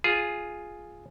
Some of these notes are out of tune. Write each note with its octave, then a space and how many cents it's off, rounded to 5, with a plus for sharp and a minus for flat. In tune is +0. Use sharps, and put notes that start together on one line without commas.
F4 +0 G#4 +0